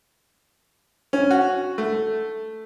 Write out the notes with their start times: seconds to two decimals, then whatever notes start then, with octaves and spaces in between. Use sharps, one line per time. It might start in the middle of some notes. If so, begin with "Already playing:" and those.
1.13 C#4
1.31 F#4
1.78 A3